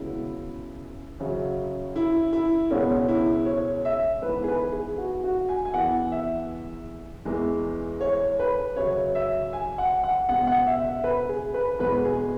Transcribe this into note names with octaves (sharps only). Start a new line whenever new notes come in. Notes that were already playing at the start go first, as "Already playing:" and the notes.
Already playing: C#2 C#3 F#3 B3 E4
F#2 C#3 F#3
E4
E4
C#2 B2 G#3 B3 C#4
E4
C#5
E5
G#2 E3 B3 B4
G#4
B4
G#4
F#4
F#4
G#5
G#5
E2 E3 B3 F#5
E5
E2 E3 G#3
C#5
B4
F#2 C#3 F#3 C#5
E5
G#5
F#5
F#5
C#2 B2 B3 F#5
F#5
E5
E5
B4
G#4
B4
E2 B2 G#3 B3 B4
G#4